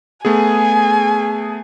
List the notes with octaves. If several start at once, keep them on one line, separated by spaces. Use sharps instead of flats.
A3 B3 G#4 G#5